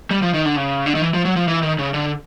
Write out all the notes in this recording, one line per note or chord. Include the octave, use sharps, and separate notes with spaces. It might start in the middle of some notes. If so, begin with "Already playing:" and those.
G3
F3
D#3
D3
C#3
D3
D#3
E3
F3
F#3
F3
E3
D#3
C#3
D3